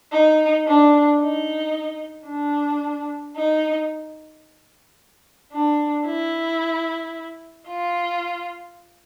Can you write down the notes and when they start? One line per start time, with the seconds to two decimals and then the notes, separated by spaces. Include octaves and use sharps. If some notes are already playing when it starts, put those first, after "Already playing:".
0.12 D#4
0.66 D4
1.20 D#4
2.28 D4
3.36 D#4
5.52 D4
6.06 E4
7.68 F4